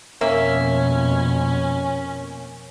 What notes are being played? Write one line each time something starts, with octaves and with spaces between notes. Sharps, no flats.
F2 B2 A#3 C#4 E5